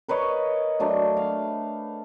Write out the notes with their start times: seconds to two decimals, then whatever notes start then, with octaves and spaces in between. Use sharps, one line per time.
0.08 A#4 B4 C#5 D#5
0.80 F#3 A3 D4
1.17 F5